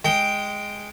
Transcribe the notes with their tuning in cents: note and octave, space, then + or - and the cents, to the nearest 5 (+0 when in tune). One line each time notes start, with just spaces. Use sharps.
G#3 +0 G5 +0